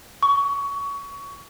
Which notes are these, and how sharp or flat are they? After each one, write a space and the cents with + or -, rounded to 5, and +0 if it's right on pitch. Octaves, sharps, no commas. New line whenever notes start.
C#6 +20